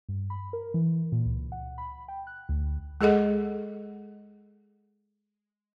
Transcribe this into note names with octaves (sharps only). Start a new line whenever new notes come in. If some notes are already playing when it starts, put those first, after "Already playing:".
G2
B5
A#4
E3
A#2
C#2
F#5
B5
G5
F#6
D2
G#3 G#4 A4 D#5 F#5